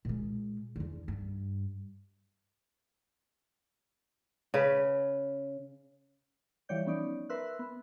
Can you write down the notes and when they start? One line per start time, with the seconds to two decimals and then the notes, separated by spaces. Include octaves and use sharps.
0.05 A#2 G#3
0.76 E2 D3
1.08 G2
4.54 C#3 B4
6.69 E3 F3 G3 C#5 D5 G6
6.86 B3 C#4 D#4 D5
7.29 A#4 B4 E5 C6 E6 F#6
7.59 B3